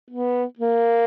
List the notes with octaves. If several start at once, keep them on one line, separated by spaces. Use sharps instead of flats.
B3
A#3